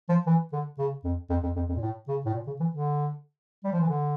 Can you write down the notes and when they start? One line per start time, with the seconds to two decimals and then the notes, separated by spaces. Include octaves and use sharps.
0.09 F3
0.26 E3
0.52 D3
0.78 C#3
1.04 F2
1.30 F2
1.43 F2
1.56 F2
1.69 F2
1.76 A#2
1.82 A2
2.08 C#3
2.25 A2
2.34 A#2
2.47 C#3
2.60 E3
2.72 D3
3.64 G3
3.72 F3
3.81 E3
3.89 D3